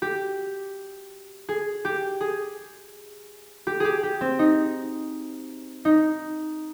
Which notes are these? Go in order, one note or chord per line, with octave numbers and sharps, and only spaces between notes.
G4
G#4
G4
G#4
G4
G4 G#4
G4
C4
D#4
D#4